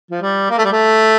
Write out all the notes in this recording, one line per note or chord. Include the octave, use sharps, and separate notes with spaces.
F3
G3
A#3
A3
G3
A3